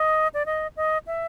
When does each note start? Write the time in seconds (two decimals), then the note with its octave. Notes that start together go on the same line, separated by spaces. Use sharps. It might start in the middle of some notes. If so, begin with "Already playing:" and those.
Already playing: D#5
0.34 D5
0.46 D#5
0.77 D#5
1.07 E5